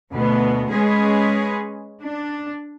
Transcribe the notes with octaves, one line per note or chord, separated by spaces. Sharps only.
D2 B2 B3
G#3 C#4 G#4 B4
D4